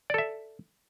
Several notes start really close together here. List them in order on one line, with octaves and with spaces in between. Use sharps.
D5 A4 E5